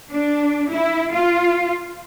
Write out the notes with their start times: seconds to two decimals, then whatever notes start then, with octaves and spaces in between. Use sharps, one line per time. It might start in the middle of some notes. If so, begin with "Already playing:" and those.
0.12 D4
0.72 E4
1.12 F4